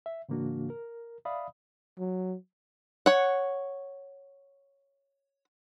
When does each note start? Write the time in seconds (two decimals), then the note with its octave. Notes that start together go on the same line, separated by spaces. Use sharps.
0.06 E5
0.29 G#2 C#3 E3 A#3 D4 F#4
0.70 A#4
1.25 D5 E5 F5 B5 D#6
1.99 F#3
3.06 C#5 F#5